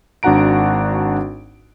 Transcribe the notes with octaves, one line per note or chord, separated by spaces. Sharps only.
G#1 D4 F#4 F#5 A#5 D7